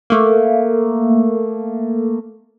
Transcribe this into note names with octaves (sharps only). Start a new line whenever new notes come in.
A3 A#3